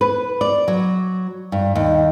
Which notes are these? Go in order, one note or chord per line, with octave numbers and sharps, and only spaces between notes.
B4
D5
F#3
G2
D#2